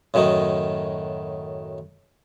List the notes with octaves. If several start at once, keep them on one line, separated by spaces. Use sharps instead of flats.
F#2 A2 D#3 F#3 D#4